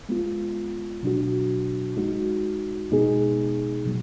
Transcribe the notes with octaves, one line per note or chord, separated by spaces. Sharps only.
G#3 B3 F4
B2 F#3 D4 F#4
G#3 D#4 F#4
B2 G#3 B3 D#4 G#4
B2 F#3